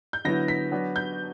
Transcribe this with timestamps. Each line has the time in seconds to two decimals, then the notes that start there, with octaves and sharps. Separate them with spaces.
0.13 G6
0.25 D3 F#3 B3 E4 A#6
0.48 B6
0.72 F#3 B3 D4
0.96 G6